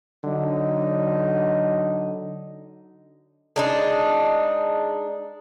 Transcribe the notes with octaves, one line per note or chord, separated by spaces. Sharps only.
D3 F#3 D#4
G#3 D4 D#4